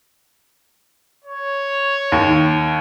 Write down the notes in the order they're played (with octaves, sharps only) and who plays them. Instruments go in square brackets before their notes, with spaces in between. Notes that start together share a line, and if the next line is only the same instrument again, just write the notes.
[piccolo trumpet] C#5
[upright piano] D#2